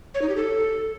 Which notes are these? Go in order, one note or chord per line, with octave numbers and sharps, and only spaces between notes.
C#5
D#4
G4
A4